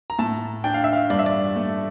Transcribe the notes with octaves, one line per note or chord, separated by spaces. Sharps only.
A#5
A2 A5
D4 G5
F5
E5
F5
G2 D5
E5
D5
A3